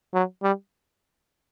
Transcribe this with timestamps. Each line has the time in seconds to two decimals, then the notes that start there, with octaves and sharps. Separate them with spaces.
0.14 F#3
0.43 G3